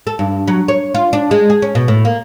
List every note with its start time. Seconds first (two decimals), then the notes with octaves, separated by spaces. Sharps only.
0.07 A4
0.19 G2
0.48 F#3
0.68 C#5
0.94 F4
1.13 D4
1.31 G#3
1.50 G#4
1.62 C#4
1.75 B2
1.88 A2
2.05 A#3